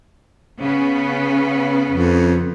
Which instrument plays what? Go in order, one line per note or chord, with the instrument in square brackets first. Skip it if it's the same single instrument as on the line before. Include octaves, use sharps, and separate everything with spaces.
[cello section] C#3 B3 C#4
[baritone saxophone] F2